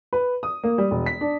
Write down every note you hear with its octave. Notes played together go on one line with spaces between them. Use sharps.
B4
D#6
A#3
G3
E1
B6
D4